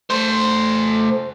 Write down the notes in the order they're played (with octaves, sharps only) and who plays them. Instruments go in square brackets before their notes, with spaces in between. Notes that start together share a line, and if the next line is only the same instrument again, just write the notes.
[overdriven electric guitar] A3 C5